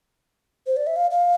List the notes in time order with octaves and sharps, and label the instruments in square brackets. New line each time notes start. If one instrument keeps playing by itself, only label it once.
[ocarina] C5
D5
E5
F5
F5